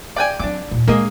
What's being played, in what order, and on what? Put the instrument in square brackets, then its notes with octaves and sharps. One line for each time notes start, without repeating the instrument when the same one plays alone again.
[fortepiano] D5 G5 G#5
[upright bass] F#3 C4 [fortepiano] D4 D6
[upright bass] D#2 A#2
[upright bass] G#3 D4 [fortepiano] A#3 G#4 D#5